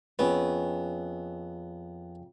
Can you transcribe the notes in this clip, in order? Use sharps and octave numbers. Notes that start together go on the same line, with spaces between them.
F2 B3 C#4 G#4